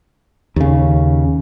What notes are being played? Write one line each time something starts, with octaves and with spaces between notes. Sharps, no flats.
D#2 C#3